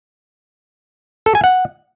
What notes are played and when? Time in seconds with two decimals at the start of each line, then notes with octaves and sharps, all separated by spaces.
1.26 A4
1.35 G#5
1.44 F#5